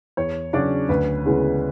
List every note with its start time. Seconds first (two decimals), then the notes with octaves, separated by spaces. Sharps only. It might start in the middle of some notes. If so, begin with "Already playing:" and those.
0.17 E2 C#5
0.53 C#3 F#3 C#4 D4 D5
0.89 D2 B4
1.26 C#3 E3 G#3 B3